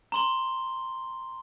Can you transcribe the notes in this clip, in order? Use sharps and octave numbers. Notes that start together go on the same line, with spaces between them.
A#5 C6 G7